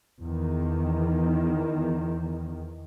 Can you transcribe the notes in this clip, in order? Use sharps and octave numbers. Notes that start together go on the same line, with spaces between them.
E2 D#3